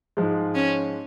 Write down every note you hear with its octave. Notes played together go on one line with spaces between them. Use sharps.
G#2 F3 G#3
C#4